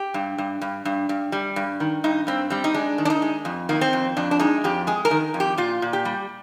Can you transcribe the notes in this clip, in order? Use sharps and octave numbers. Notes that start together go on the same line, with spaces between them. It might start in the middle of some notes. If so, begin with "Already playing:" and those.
Already playing: G4
G2
G2
G2
G2
G2
G3
G2
D#3
G2 D#4
G2 C4
G3 C4
D#4
G#3 D4
D#3
D4
D#4
G#3
F2
D#3 A#3
C4
F2
F2 D4
D4
G#3 D#4
F2 G4
G#3 G#4
A#4
D#3
F2
G4
A#2 F4
A#2
G4
G3